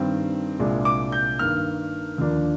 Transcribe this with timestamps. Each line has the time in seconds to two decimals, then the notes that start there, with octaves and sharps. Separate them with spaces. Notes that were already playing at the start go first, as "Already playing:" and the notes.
Already playing: G2 D#3 G3 C4
0.59 C2 A#2 G#3 D4
0.85 D6
1.12 G6
1.38 G2 D#3 A#3 F6
2.18 D#2 D3 F3 A#3 D4